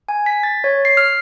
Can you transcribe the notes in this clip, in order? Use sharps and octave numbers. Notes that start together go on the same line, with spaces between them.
G#5
B6
A6
C#5
C7
F6